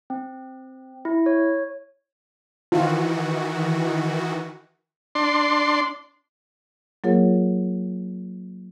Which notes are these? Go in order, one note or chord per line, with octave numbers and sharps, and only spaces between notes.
C4
E4
C#5
D#3 E3 F4 F#4
D4 C6
F#3 A#3 F4 G#4 A#4 C#5